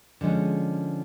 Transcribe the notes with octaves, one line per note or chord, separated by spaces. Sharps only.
D3 F3 G#3 C#4